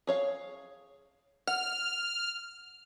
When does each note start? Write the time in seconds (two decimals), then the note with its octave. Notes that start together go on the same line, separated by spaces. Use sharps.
0.07 G#4 C#5 F5
1.47 F#5 F6